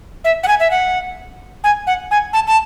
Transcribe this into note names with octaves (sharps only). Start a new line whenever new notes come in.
E5
F#5
G#5
E5
F#5
G#5
F#5
G#5
A5
A5